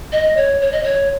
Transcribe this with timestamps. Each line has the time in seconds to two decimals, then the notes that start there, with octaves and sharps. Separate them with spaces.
0.12 D#5
0.37 C#5
0.61 C#5
0.72 D#5
0.83 C#5